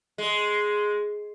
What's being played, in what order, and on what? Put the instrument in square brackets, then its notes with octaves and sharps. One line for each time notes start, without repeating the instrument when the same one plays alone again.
[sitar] G#3